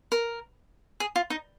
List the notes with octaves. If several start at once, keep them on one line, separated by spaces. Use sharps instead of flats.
A#4
G#4
F4
D#4